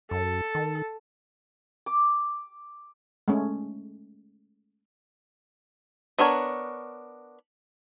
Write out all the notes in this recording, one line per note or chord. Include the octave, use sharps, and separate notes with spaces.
F#2 A4
D#3
D6
G#3 A3 C#4
B3 D4 A#4 C#5